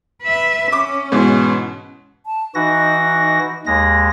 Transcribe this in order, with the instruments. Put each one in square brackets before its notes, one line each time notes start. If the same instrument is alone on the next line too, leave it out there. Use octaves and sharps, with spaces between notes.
[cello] B4 E5
[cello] C#4 [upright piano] D6
[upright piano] G#2 B2 E3
[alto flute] A5
[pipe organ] E3 F#4 A#6 [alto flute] D#4
[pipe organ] D#2 G#3 A#6